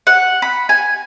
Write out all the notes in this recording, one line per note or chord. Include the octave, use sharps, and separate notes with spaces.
F#5
B5
G#5